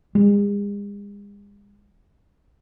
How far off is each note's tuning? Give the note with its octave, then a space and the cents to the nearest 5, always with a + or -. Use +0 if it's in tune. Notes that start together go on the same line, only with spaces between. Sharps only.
G#3 -45